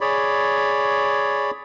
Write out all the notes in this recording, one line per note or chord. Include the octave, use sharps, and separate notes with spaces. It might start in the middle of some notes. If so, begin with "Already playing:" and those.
G#4 C#5 D5 B5